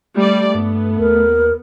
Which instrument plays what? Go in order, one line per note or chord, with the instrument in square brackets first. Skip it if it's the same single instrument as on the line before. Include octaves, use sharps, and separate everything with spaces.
[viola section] G3 D5 [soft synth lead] A3
[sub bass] G2 [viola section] B3
[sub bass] D#2 [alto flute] A#4